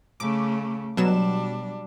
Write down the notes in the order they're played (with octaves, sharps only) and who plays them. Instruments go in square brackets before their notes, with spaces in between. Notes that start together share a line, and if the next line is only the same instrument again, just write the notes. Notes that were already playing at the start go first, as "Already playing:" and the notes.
[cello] C#3 A3 [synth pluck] D6
[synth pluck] B2 F#3 E7 [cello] G3 D4